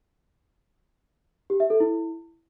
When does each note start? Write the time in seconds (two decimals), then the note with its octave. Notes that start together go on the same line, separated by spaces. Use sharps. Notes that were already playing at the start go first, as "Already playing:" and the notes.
1.50 G4
1.60 E5
1.70 A4
1.80 E4